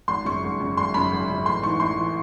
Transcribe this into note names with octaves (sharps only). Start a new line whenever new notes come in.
G#1 C6
F#2 C#3 C#6
G#1
F#2 C#3
G#1 C6
F#2 C#3 B5
G#1
F#2 C#3
A1 C6
G#2 E3 C#6
A1 C6
E3